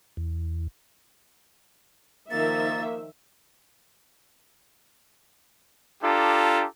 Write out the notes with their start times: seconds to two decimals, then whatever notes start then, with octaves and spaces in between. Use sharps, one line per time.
0.17 E2
2.31 D#3 F3 A#3 E5 A6
6.03 D4 F4 G4 A4 A#5